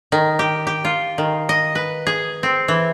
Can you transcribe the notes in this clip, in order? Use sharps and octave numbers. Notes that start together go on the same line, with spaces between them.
D#3
G4
G4
F4
D#3
D#5
B4
G#4
C4
E3